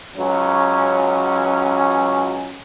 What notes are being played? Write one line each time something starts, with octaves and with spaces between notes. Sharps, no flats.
C#2 F#3 C#4